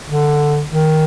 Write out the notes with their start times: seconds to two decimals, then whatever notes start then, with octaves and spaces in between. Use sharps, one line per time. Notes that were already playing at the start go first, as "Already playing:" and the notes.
0.09 D3
0.69 D#3